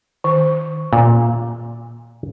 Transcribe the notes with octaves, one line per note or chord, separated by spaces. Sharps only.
D#3
A#2